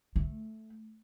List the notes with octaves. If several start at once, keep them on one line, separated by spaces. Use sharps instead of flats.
A3